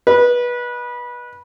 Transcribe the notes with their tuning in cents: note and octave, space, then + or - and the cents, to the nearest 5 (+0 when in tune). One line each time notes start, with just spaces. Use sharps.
B4 -20 D#5 -30